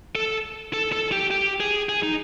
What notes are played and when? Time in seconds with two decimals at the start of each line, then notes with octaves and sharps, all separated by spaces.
0.15 A4
0.73 A4
0.93 A4
1.12 G4
1.31 G4
1.60 G#4
1.89 G#4
2.03 D#4